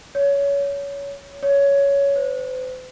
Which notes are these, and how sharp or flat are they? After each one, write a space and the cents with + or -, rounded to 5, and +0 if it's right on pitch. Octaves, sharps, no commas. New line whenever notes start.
C#5 +25
C#5 +15
C5 -45